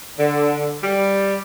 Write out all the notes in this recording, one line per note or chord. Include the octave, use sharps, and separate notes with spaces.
D3
G3